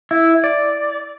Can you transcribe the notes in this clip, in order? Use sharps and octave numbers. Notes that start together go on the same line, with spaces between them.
E4
D5